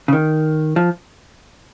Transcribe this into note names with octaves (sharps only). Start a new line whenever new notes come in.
C#3
D#3
F3